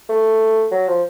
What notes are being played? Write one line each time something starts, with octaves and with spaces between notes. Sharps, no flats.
A3
F#3
F3